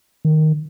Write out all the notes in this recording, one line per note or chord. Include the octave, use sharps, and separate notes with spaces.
D#3